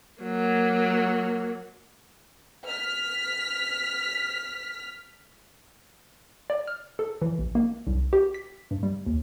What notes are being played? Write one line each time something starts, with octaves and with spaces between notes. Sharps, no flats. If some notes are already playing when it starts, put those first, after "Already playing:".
F#3 A#3
F6 B6
D5
F6
A4
E3
A1
A#3
C2
G4
B6
G2
G3
D#2